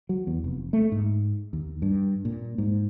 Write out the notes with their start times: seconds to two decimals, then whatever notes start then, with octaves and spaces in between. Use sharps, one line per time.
0.09 F#3
0.27 E2
0.44 F1
0.73 A3
0.92 G#2
1.53 D#2
1.82 G2
2.25 A#2
2.58 G#2